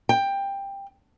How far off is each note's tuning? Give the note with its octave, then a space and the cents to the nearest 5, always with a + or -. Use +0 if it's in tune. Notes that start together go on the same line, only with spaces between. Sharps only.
G5 +15